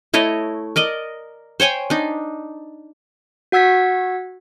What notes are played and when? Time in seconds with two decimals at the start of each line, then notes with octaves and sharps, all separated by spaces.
0.14 A3 E4 C#5 D#5
0.76 A#4 D5 D#5
1.60 C5 C#5 G5 G#5
1.90 D4 D#4
3.52 F#4 F#5 E6 G#6 B6